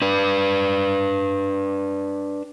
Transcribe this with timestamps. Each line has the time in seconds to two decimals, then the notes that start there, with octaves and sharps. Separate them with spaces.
0.02 D4 B4